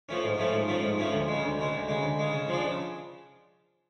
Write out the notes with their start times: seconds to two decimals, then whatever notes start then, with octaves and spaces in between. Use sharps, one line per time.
0.09 F3 A3 C#4
0.24 G#2
0.38 F3 A3 C#4
0.53 G#2
0.68 F3 A3 C#4
0.83 G#2
0.98 F3 A3 C#4
1.13 D2
1.28 C#3 G#3
1.43 D2
1.59 C#3 G#3
1.74 D2
1.88 C#3 G#3
2.03 D2
2.19 C#3 G#3
2.33 C#3
2.48 F3 G#3 D4
2.64 C#3